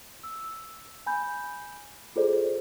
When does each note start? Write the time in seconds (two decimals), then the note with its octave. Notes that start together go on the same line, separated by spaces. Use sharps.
0.23 E6
1.06 G#5 B5 G6
2.16 F4 G#4 A4 C5 D5